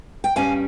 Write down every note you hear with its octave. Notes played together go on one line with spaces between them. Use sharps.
G5
G2 G3 C#4 F5 G#5